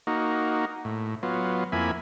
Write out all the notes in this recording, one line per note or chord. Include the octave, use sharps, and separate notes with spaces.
A#3 D#4 F#4
A2
F#3 B3 F4
F2 A#3 E4 G#5 B5